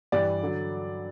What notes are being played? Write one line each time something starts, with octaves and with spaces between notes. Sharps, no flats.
G2 E3 G3 D5
D3 F#3